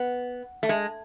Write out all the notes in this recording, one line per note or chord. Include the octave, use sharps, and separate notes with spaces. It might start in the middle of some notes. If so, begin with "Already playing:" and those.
Already playing: B3
A3
G#3